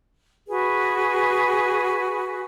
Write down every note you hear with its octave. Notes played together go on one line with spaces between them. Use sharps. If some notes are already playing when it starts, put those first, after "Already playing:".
F#4 G#4 B4